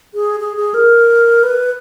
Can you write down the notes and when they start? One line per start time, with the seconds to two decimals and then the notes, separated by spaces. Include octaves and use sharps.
0.14 G#4
0.40 G#4
0.57 G#4
0.74 A#4
1.43 B4